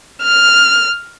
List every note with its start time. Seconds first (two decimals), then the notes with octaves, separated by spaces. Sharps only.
0.23 F6